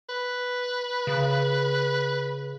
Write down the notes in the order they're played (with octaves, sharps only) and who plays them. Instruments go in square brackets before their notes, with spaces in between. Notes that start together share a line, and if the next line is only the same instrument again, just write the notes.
[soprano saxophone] B4
[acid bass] C#3